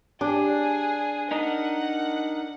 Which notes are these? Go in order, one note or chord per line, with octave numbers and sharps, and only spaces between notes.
D4 G4 G#4
D#4 A#4 D#5 F#5